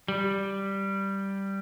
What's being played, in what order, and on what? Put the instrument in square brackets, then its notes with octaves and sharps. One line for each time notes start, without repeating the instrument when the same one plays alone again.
[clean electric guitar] G3